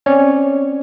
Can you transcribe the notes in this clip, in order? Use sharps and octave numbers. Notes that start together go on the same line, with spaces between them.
C4 C#4 C#5 D5